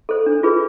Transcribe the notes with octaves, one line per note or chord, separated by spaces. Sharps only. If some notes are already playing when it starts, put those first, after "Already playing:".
A4 C5
D4
F4 G#4 B4